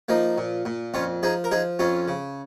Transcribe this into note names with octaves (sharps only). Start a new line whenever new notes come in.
F3 A#3 D#4
A#2
A#2
F2 C#4 F4
F3 D#4 G#4
A#4
F3 D#4 G#4
F2 C#4 F4
C#3